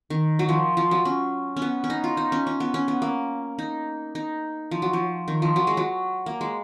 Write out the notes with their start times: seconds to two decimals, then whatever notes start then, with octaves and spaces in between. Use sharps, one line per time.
0.10 D#3
0.39 F#3
0.49 F3
0.77 F3
0.91 F#3
1.05 C#4
1.56 C#4
1.62 B3
1.84 C#4
1.90 D#4
2.04 F4
2.17 D#4
2.32 C#4
2.47 C#4
2.60 B3
2.74 C#4
2.88 B3
3.02 A#3
3.59 D#4
4.15 D#4
4.71 F3
4.82 F#3
4.93 F3
5.28 D#3
5.42 F3
5.56 F#3
5.67 G#3
5.77 F#3
6.26 A#3
6.41 G#3